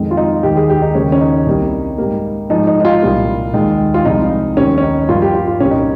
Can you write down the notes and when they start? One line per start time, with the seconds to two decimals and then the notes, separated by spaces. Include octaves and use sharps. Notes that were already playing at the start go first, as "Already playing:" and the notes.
Already playing: F2 D#3 G#3
0.11 F4
0.17 D#4
0.43 D#2 D#3 G3 G4
0.56 G#4
0.70 G4
0.82 D#4
0.95 D#2 C#3 G3 A#3 C#4
1.12 C#4
1.21 D#4
1.47 C2 C3 G3 A#3
1.98 G#2 G3 A#3
2.50 G#2 F3 G#3 D#4
2.67 D#4
2.80 D#4
2.85 F4
3.02 C2 A#2 G3 A#3
3.53 D#2 D#3 G#3
3.94 F4
4.05 C2 C3 F3 G#3 D#4
4.57 D#2 D#3 G3 A#3 C#4
4.78 C#4
4.83 D#4
5.08 G2 F3 A#3 F4
5.22 G4
5.35 F4
5.48 F4
5.60 C2 A#2 G3 A#3 C#4
5.71 D#4